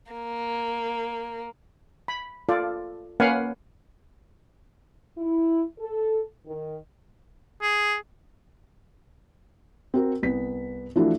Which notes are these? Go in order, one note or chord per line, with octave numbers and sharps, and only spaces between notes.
A#3
B5
F4 A4 D5
A#3 C#4 B4 F5 F#5 G#5
E4
A4
D#3
G#4
C4 F#4 A#4
C2 B3 B6
E3 F3 A3 D4 E4 F#4